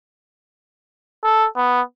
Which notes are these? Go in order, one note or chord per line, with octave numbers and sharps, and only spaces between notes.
A4
B3